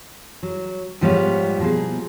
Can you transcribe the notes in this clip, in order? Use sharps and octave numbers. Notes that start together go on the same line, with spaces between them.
F#3
G#2 F3 G3 B3 C#5 F5
B2 F3 A#3 G#4